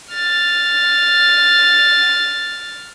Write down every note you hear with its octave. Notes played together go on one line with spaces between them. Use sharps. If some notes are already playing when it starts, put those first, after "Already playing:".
F6 A6